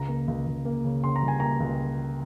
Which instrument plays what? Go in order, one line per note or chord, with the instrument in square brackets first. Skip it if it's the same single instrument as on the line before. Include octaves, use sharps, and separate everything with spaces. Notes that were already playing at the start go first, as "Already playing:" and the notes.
Already playing: [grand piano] C#2 A#5
A#3
C#2
C#2
A#3
C#3
C#3 C6
A#5
G3
G#5
A#3 A#5
C#2